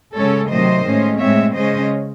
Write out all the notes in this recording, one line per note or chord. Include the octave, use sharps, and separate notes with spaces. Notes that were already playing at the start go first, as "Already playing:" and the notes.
C#3 G#3 C#4 A4 C#5
C3 D#3 F#3 A3 C5 D#5
A2 G#3 C#4
A2 G#3 C4 C#5 E5
C#3 G#3 C#4 C5 D#5